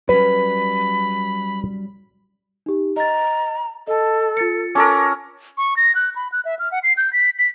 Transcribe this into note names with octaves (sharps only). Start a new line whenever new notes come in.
F#3 G3 C#4 B4 B5
D#4 G4
D#5 A#5 A6
A4 D#5 A5
F4 A6 C#7
C#4 A4 A#4 D6
C#6
A#6
F#6
B5
F#6
E5
F6
F#5
C7
G6
B6
B6